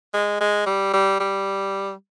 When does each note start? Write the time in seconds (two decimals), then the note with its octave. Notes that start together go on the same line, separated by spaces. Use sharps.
0.14 G#3
0.41 G#3
0.66 G3
0.93 G3
1.20 G3